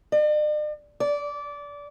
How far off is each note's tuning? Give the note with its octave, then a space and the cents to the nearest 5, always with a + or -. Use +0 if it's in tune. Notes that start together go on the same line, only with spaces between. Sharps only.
D5 +45
D5 -20